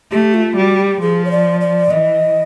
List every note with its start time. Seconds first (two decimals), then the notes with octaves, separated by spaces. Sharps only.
0.11 A3 G4
0.34 F4
0.56 G3 F#4
0.79 G4
1.01 F3 G#4
1.25 C#5
1.31 D5
1.61 D5
1.91 E3 D#5